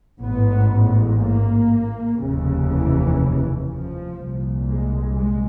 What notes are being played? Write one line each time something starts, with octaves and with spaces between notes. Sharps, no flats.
A1 B3
G#2
A#3
F1 D#2 C#3
E3
F3
C2 A#2
G#3
G#3